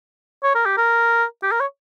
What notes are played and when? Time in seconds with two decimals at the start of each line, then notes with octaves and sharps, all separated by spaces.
0.43 C#5
0.55 A#4
0.66 G4
0.78 A#4
1.43 G4
1.52 A#4
1.60 C#5